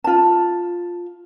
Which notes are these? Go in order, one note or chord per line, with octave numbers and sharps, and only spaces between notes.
F4 A5